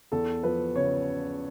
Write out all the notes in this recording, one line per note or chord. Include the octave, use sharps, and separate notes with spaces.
E2 A4
F3 B4
C#3 C#5